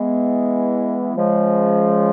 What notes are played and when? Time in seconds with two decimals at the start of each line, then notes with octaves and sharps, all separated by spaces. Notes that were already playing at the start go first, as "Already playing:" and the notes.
Already playing: E3 G#3 B3
1.16 C#3 F3 G#3